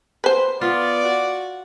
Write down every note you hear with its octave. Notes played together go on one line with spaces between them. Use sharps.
B4 C5
B3 F4 D5
F#4